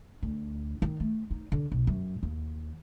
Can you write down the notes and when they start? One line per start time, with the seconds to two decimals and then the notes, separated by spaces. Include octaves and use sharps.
0.22 D2
0.82 D#3
1.00 A3
1.31 D#4
1.52 D3
1.72 B1
1.87 F#2
2.23 D#2